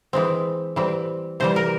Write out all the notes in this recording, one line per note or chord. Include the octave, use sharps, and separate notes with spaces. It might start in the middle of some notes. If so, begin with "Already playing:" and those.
E3 G#3 C4
E3 G3 C4
C3 E3 G3 C5
A#4